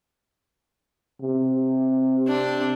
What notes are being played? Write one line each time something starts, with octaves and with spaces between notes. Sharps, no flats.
C3
C4 D4